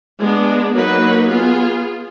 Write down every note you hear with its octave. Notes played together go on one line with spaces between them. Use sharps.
G#3 B3 D4
F#3 A#3 D#4 F#4 B4
B3 F4 G#4